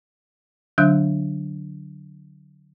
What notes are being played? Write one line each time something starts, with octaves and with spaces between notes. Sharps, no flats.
D3 F#3 D4 E5 E6 F#6